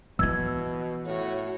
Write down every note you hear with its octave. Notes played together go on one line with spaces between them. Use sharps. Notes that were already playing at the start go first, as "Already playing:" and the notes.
B2 E3 E4 E6 G#6
A2 F#4 C#5